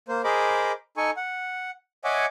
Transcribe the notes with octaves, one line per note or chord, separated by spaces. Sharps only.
A#3 C5
G#4 A#4 C5 D#5 B5 D6
D#4 A4 G#5 C#6
F#5
C#5 D#5 E5 F#5 G#5 D6